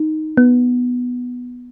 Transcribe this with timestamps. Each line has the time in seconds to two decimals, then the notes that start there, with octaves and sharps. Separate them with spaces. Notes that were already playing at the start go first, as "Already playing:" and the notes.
Already playing: D#4
0.37 B3